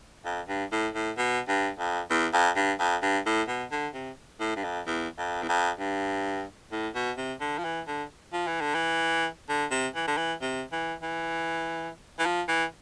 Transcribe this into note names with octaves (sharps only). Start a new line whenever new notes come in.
F2
G2
A2
A2
B2
G2
F2
E2
F2
G2
F2
G2
A2
B2
D3
C3
A2
G2
F2
E2
F2
E2
F2
G2
A2
B2
C3
D3
F3
E3
D3
F3
E3
D3
E3
D3
C3
E3
D3
E3
C3
E3
E3
E3
F3
E3